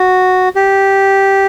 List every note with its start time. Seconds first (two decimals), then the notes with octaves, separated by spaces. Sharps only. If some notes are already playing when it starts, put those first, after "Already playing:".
Already playing: F#4
0.55 G4